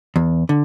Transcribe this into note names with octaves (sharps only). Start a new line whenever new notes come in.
E2
D3